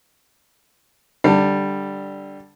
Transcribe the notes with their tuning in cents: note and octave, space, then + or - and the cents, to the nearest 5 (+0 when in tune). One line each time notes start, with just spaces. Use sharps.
D3 +0 G3 +0 A5 +30